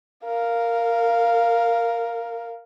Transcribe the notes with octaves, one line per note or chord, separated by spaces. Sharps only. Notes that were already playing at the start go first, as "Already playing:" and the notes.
A#4 F5